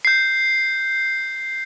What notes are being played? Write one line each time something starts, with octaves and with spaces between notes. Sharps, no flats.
G6 C7